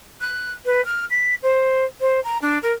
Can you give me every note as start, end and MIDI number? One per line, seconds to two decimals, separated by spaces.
0.21 0.52 90
0.66 0.84 71
0.85 1.05 89
1.10 1.35 95
1.43 1.85 72
2.00 2.20 72
2.24 2.38 82
2.42 2.58 62
2.63 2.72 70